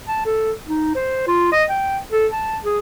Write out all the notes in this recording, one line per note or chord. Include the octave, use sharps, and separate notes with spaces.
A5
A4
D#4
C5
F4
D#5
G5
A4
A5
G#4